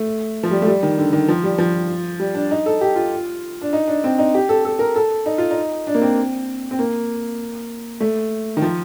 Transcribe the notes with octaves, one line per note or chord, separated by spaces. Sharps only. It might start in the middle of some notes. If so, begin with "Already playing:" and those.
Already playing: A3
F3
G3
A3
G3
D#3
D3
D#3
F3
G3
F3
G3
D4
D#4
A4
G4
F4
D4
D#4
D4
C4
D#4
G4
A4
A4
A#4
A4
D#4
F4
D#4
D4
A#3
C4
C4
A#3
A3
D#3
F3